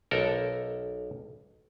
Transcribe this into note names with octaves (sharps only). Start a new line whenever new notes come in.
B1 A4 A#4